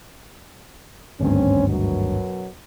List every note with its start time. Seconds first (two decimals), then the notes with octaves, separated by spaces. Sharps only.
1.20 G#1 D2 G2 C4 C#4
1.67 F#2 B2 F#3